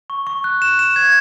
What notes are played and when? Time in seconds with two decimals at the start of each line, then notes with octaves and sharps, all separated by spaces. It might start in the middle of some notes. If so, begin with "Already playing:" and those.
0.10 C#6
0.27 C#6
0.44 F#6
0.62 E7
0.79 E7
0.96 G#6